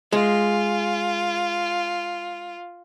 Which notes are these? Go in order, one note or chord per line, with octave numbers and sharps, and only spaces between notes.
G#3 F4